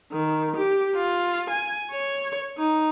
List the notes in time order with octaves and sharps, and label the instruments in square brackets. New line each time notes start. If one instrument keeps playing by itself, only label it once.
[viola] D#3
G4
F4
G#5
C#5
D#4